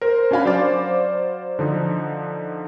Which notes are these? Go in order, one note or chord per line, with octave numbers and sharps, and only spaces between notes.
A#4 C5
C#4 D4 F#4 F5 G#5 B5
F#3 C5 D5 F5 D6 A6
D3 F3 D#4